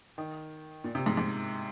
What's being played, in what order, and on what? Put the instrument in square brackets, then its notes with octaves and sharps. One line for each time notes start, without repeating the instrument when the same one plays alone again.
[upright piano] D#3
A#2
C3
G#2
G#2